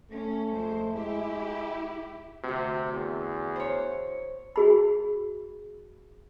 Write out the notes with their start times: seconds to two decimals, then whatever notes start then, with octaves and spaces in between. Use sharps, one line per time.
0.11 A3 C#4
0.52 F2 G#3 C5
0.95 G#3 E4 G4
2.44 D2 C3 F#4
2.93 E2
3.56 C5 C#5
4.56 F#4 G#4 B5